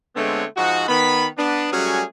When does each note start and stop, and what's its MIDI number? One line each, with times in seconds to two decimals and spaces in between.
0.16 0.44 50
0.16 0.44 56
0.16 0.44 57
0.16 0.44 59
0.16 0.44 60
0.16 0.44 73
0.57 0.87 44
0.57 0.87 53
0.57 0.87 63
0.57 0.87 66
0.88 1.25 51
0.88 1.25 59
0.88 1.25 83
1.38 1.71 59
1.38 1.71 62
1.72 2.03 54
1.72 2.03 55
1.72 2.03 57
1.72 2.03 61
1.72 2.03 66
1.72 2.03 68